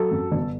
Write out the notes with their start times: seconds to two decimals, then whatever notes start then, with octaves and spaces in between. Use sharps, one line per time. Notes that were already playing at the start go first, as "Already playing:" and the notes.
Already playing: F#3 A4
0.11 F#2
0.32 G1